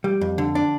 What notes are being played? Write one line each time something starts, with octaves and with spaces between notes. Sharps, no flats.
G3
F2
D3
D4